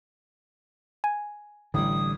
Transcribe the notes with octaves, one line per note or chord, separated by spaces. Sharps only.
G#5
A1 D3 G3 D#6